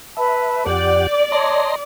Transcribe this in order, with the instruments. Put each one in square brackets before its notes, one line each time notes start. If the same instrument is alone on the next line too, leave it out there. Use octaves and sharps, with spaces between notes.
[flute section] B4 A5 B5 [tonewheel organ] E5
[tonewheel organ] F2 G4 F#5 [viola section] D5 [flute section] G6
[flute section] C#5 A5 [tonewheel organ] D#5 A#5 C6